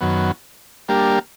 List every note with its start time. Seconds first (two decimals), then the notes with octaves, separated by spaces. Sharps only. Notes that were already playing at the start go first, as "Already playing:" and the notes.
0.01 F#2 D#3 F#3 B3
0.89 G3 A#3 D4 G4 A#4